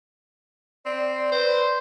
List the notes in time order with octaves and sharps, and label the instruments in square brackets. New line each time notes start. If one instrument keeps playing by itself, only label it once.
[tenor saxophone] C4 [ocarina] D5
[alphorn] B4 [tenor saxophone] C5